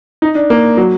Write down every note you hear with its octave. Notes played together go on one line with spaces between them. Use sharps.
D#4
D4
A#3
F#3